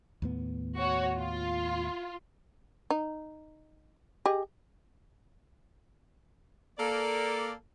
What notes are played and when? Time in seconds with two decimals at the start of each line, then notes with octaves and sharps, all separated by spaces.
0.22 D#2 A2 B3
0.77 F#4 C#5
1.17 F4
2.90 D#4
4.26 G4 G#4 D#5
6.79 A#3 A4 D5